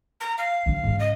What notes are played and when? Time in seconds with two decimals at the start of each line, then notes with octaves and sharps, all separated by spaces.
0.21 A#5
0.38 F5
0.66 D3 F#3
0.83 G#2 C#3
0.99 D#5